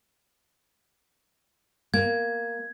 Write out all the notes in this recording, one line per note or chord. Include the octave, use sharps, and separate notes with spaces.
A#3 G#6